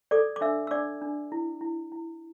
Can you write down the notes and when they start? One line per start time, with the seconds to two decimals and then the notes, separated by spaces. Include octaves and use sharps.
0.11 A4 D5 D6
0.36 D6
0.41 D4 E5 E6
0.67 E6
0.71 D4 D5 D6
1.02 D4
1.32 E4
1.61 E4
1.92 E4